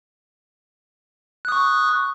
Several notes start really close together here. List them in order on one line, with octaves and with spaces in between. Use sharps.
F#6 D#6 C#6